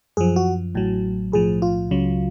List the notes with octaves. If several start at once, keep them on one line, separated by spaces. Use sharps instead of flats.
F#2 F3 G#4
F#4
A1 A2 F#3
B1 A2 F3 G#4
F4
C#2 C#3 F#3